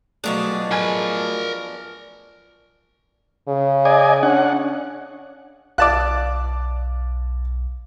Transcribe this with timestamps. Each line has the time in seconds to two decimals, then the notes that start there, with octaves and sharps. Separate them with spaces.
0.24 B2 F3 F#3 A3 D4 G#4
0.71 A#4 G#5 B5 F6 G#6
3.48 C#3
3.85 D5 D#5 G#5
4.23 C#4 D4 F#5
5.78 B1 D5 F5 A5 D6 F#6